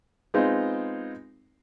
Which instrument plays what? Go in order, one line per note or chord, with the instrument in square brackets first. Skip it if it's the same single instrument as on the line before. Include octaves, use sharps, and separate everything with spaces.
[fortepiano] G#3 B3 C4 D#4 F4